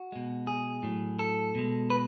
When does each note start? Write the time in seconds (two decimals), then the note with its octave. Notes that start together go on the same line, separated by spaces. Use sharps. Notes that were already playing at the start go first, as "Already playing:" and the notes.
Already playing: F#4
0.12 B2 G#3
0.47 G#4
0.83 A2 F#3
1.19 A4
1.55 B2 G#3
1.90 B4